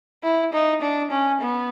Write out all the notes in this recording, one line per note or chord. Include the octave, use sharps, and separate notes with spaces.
E4
D#4
D4
C#4
B3